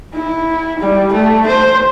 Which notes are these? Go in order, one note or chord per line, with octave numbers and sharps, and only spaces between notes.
E4
G3
A3
C5